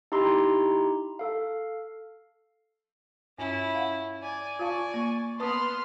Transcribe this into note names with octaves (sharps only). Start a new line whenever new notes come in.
D#4 E4 G4 A#5 C6
A4 F5
G2 C#4 E4
F5 F#5
D5 G#5
F4 F5 G#5 A5 C#6
A#3
B3 B4 A5 C6 D#6 F6